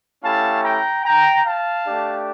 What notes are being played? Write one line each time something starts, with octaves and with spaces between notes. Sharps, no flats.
A3 C#4 E4 G4 F5 A5
G5 A#5
G5 A#5
F5 A5
A3 D4 G4